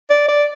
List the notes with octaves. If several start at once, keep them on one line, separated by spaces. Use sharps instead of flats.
D5
D5